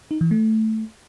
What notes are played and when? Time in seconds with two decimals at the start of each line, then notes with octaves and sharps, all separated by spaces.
0.11 D#4
0.21 E3
0.31 A3